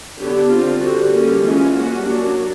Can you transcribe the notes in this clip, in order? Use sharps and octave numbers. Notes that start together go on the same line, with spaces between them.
D3 F#3 B3 D4 G4
D3 G3 C4 F4
D3 G3 C4 F#4
D3 G3 A#3 C#4
E3 G#3 C#4 F4
G3 A#3 C#4 F#4
F#3 A#3 D4 F#4